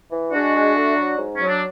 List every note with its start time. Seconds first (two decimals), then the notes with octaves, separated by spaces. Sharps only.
0.10 E3
0.31 G#3 D4 F#4
0.54 G#3
0.75 A3
0.96 F#3
1.16 G#2
1.35 F#3 C#4
1.47 D4